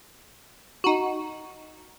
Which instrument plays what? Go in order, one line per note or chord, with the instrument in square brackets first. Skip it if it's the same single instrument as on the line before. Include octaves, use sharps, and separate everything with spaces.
[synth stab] D#4 F#4